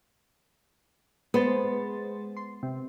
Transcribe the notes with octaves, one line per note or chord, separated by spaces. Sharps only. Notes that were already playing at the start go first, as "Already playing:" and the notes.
G#3 B3 C5 A6
C6
C3